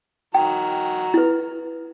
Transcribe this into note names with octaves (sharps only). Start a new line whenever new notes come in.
D#3 F#4 G5 A#5
E4 B4